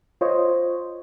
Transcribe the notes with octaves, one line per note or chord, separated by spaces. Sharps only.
F4 C5 C#5 D#5